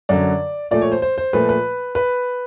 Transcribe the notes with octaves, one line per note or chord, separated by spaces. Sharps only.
F#2 D3 F#3 D5
A#2 F3 A3 D5
C#5
C5
C5
C5
A#2 F3 A3 B4
B4
B4